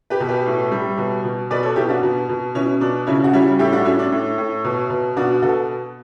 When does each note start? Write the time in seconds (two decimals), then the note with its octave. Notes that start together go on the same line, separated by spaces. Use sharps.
0.10 G4 B4
0.20 B2
0.28 G4 B4
0.46 A2
0.72 G3
0.98 B2
1.25 B2
1.50 B2 B4 D5
1.63 A4 C#5
1.76 B2 E4 G4
1.89 D4 F#4
2.03 B2
2.29 B2
2.54 B2 C#4 E4
2.81 B2 D4
3.07 C#3 C#4 E4
3.24 F#4
3.33 G3 C#4 E4
3.59 A2 E4 G4
3.73 D4 F#4
3.85 A2 C#4 E4
3.99 D4
4.12 A2
4.38 A2
4.64 B2
4.90 B2
5.17 B2 D4 F#4
5.42 B2 F#4 A4